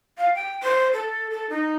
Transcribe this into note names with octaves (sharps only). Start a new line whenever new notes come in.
F5
G5
C5
A4
A4
D#4